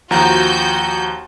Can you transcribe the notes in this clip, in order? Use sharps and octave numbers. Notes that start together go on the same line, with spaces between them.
D#2 F3 F#4 A#5 G6